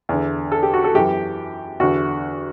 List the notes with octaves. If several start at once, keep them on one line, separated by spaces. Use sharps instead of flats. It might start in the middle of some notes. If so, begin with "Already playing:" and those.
E2 D3
A4
G4
F#4
A4
F#2 E3 G4
E2 D3 F#4